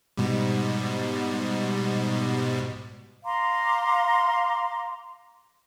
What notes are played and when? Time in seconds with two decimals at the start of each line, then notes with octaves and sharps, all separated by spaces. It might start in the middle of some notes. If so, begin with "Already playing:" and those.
0.17 G#2 B2 G3
3.24 F5 A#5 C6 D6